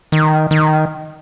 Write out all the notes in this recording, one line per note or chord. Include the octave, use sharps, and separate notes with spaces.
D#3
D#3